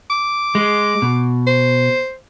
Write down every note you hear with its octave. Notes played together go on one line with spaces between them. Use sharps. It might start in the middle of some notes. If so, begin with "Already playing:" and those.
D6
G#3
B2
C5